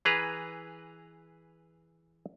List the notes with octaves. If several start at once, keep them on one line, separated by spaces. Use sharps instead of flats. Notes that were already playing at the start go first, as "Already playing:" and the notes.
E3 G#4 B4 A#5